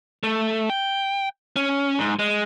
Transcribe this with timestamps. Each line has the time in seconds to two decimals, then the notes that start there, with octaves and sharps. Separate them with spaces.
0.23 A3
0.70 G5
1.56 C#4
1.99 G#2
2.19 G#3